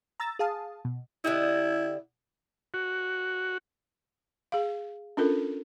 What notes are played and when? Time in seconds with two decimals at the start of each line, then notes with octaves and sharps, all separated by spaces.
0.20 A#5 E6 A6
0.39 G#4 F5 A5 D#6
0.85 B2
1.24 D3 E4 G4 D#5
2.74 F#4
4.52 G#4 F5
5.17 C#4 D4 F4 A4 A#4